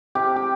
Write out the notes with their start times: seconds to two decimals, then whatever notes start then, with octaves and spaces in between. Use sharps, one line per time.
0.15 C3 G4
0.36 G4